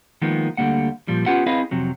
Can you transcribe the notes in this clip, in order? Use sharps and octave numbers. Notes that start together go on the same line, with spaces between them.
D#3 F3 G#3 A#3 B3
D2 D3 G3 A#3 F#5
A#2 F3 G3
B3 C#4 F4 G4 F#5
C4 E4 G#4 B4 D#5 F5
F2 C3 F#3